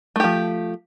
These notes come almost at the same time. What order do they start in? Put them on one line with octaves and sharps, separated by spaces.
A3 G4 F3